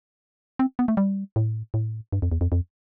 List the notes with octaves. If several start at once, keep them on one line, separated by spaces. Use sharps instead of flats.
C4
B3
A3
G3
A2
A2
G2
F2
E2
F2
F2